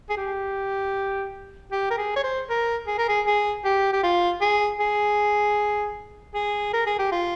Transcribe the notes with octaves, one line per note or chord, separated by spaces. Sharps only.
G#4
G4
G4
A#4
G#4
C#5
C5
A#4
G#4
A#4
G#4
G#4
G4
G4
F4
G#4
G#4
G#4
A#4
G#4
G4
F4